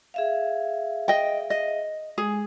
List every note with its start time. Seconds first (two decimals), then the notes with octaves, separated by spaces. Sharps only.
0.14 G#4 E5 F5
1.08 D#5 G5
1.50 D#5
2.18 G#3 G#4 G#5